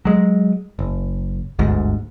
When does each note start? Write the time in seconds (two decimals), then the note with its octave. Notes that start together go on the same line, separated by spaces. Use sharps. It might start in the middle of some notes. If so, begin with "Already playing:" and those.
0.05 F#3 G#3
0.79 F#1
1.59 G1 D2 G#2